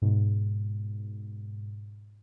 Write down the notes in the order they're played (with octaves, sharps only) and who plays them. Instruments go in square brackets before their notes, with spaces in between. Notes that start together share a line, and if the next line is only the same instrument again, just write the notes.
[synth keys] G#2 B2